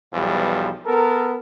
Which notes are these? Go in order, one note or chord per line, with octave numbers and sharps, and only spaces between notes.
B1 E2 F3 G3
B3 A4 A#4